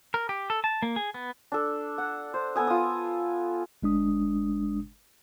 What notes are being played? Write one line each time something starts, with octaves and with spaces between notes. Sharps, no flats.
A#4
G4
A4
A5
A#3
G#4
B3
D4 A4
F#5
C5
B3 A4 G#5 D#6
F4 D#6
G1 G#3 D4 D#6